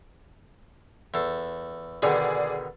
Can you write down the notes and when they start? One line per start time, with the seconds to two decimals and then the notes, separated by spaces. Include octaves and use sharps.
1.14 E2 A4 C6
2.02 B2 D3 D#3 G#4 D5